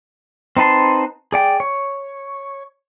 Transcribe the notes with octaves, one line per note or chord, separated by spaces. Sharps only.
C4 D#4 B4 A5 C6
G#4 D5 G5
C#5